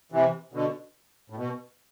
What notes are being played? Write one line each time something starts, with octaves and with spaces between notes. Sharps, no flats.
C3 E3
B2 D3
A2
B2